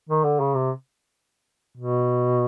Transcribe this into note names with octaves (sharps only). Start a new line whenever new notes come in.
D#3
D3
C#3
C3
B2